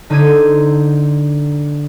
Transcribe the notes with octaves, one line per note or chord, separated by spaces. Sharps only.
D3 D#4 C5 E6 G#6 D#7